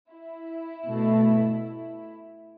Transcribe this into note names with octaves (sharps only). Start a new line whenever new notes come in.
E4
B2 A3